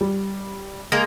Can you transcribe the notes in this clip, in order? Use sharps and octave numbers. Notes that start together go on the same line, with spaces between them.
G3
G#3 A#3 A#5